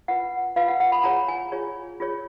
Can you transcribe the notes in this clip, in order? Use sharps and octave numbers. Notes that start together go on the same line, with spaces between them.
F4 B4 F#5
F4 B4 F5
F#5
F#5
B5
F4 G#4 C#5 A#5
G#5
F4 G#4 C#5
F4 G#4 C#5